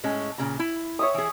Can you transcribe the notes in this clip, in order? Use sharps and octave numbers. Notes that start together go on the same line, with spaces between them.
A2 G#3 C#4
A#2 C#3 A#5
E4
C#5 E5 D#6
E3 G#4